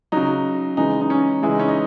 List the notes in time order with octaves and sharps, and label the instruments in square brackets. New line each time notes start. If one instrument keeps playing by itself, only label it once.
[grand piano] C#3 F#3 D#4
C#3 E3 G#3 D#4
D#4
C#4
C#3 E3 G#3 E4
D#4
C#4
D#4